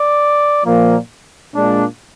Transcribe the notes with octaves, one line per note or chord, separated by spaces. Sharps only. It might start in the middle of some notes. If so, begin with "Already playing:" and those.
Already playing: D5
A#2 F3 A#3
A#2 G#3 D4